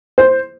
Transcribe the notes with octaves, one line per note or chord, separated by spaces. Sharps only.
C5